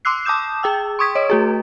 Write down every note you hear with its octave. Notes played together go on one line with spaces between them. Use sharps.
C6 D6 E6 F#6 C7
A5 D6 D#6 G6 E7
G#4 G5 E6
C6 C#6 D#6 G#6 B6
C#5 D#5 D7
A3 F#4 G#4